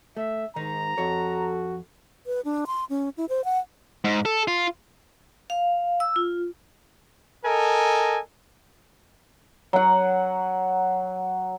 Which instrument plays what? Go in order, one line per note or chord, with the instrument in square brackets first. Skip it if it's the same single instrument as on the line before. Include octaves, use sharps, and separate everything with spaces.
[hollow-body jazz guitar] A3 [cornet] E5
[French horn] G#2 [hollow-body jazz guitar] D#3 D#4 [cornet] A#5
[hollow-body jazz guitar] F2 C#5 [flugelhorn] F#4 [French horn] A4
[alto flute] B4
D4
C6
C#4
E4
C5
F#5
[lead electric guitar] G#2
A4
F4
[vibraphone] F5
E6
F4
[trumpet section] A4 A#4 D#5 G#5
[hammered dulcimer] F#3 F#5